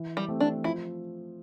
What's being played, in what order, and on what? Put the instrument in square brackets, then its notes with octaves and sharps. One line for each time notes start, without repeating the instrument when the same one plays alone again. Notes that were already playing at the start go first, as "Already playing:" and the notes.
Already playing: [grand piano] E3
[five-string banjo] G3
[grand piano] A3 C4 G4
[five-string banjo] D4
[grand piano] F3 [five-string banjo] E4